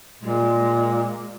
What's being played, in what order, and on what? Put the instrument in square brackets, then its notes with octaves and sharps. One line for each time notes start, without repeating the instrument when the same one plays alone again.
[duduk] A#2 [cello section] G#3